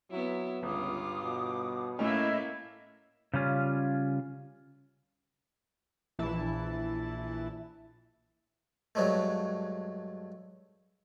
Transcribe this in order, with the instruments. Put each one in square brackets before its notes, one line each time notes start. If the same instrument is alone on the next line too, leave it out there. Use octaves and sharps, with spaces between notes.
[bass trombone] F#3 [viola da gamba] B3 E4
[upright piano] G1 [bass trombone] C#2 [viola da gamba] G2 F4 [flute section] D6 D#6
[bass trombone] B2
[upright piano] A2 C#4 [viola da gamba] A3 A#3 [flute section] E4 D#5
[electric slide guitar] C#3 G3 C#4 F4
[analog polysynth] A#1 E3 E4 A5
[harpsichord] G2 F#3 G#3 A3